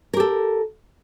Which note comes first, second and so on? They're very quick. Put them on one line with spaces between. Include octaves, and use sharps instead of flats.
A#4 G4 A4